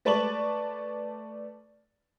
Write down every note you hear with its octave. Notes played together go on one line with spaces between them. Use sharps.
A3 B4 D5 A5 C#6 F#7